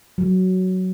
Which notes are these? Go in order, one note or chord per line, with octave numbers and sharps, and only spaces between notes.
F#3